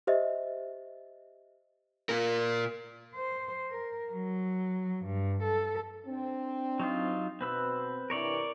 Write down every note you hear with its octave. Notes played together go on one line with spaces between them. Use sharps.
G4 C5 D#5 E5
A#2 A#4
C5
A#4
F#3
G2
A4
C4 D4
F#3 D#4 F4
B2 C4 B4 E6
G2 C3 E3 A#4 C#5 D5